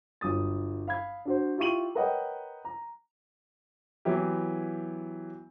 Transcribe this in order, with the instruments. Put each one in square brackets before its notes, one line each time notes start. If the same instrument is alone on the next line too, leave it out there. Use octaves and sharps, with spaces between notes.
[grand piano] G1 F#3 D#6 A6
F5 B5 G#6
D4 F#4 C5
E4 F4 G4 C#6 D#7 F#7
A#4 B4 C#5 D#5 F#5 G5
A#5
E3 F#3 B3 E4 G4